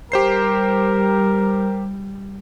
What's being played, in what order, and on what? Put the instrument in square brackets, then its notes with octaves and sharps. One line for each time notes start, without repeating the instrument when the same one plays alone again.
[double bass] G3 [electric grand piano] G4 C5 C7 [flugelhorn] A#4